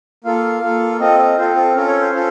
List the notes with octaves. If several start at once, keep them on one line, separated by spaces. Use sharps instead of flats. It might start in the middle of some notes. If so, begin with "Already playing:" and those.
A#3 F4 A4 F5
A#3 F4 A4
C4 F4 A4 D#5
D#5
C4 F4 A4 C5
A4
C#4 F4 A4 A#4
C#5
C5
C#4 F4 A4